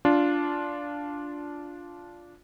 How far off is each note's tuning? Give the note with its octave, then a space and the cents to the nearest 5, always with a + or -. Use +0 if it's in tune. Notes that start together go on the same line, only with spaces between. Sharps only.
D4 -10 F4 +0